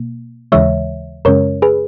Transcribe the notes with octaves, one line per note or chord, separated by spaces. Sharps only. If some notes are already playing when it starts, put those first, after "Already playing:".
Already playing: B2 A#3
D#2 C#3 E3 G#3 C#5 E5
F#2 C#3 G#3 C#4 A#4 C#5
G#4 B4